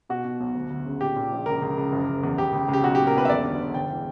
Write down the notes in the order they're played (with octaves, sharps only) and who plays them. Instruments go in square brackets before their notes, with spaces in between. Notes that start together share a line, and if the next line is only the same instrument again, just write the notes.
[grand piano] B2 F#4
B2
B1
D2
D2
C#3
A#2 G4
A#2
A#1
C#2 A#4
C#2
C#2
F#1
F#1
E2
C#2 G4
C#2
C#2
G4
B1 F#4
A#2 G4
A#4
B1 B4
E5
E1 D5
D3
E1
G1 G5
E3